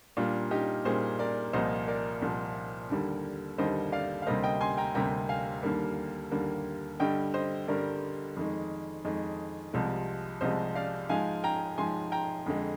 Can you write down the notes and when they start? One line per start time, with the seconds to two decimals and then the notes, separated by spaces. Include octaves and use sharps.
0.17 A#2 G3 A#3 D4 F4
0.51 D#4 G4
0.85 A#2 G3 A#3 G#4 C5
1.19 A#4 D5
1.53 C2 A#2 F3 A#3 C5 D#5
1.88 A#4 D5
2.22 C2 A#2 F3 A#3
2.90 D#2 D3 G3 A#3
3.58 D#2 D3 G3 A#3 C5 D#5
3.92 D5 F5
4.22 F5
4.26 D2 C3 G3 A#3 C5 D#5
4.44 D#5 G5
4.61 G#5 C6
4.78 G5 A#5
4.95 D2 C3 G3 A#3 G5 A#5
5.29 F5 G#5
5.63 D#2 D3 G3 A#3
6.32 D#2 D3 G3 A#3
7.00 G2 D3 G3 D#5 G5
7.34 C5 D#5
7.68 G2 D3 G3 A#4 D5
8.37 F2 D#3 G#3
9.04 F2 D#3 G#3
9.73 C2 C3 F3 G#3
10.41 C2 C3 F3 G#3 C5 D#5
10.75 D5 F5
11.09 G#2 F3 G#3 F5 G#5
11.44 G5 A#5
11.78 G#2 F3 G#3 G#5 C6
12.12 G5 A#5
12.46 F2 D3 G#3